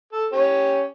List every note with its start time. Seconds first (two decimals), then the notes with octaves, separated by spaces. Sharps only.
0.12 A4
0.32 C#4 G4 C#5